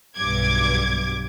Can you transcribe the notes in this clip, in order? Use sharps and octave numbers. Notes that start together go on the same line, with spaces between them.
B1 G2 D6 G#6